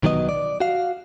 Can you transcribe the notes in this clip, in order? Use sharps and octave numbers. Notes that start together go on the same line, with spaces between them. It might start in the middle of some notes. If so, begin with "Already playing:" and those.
B1 D#3 F#3 B3 D#5
D5
F#4 F5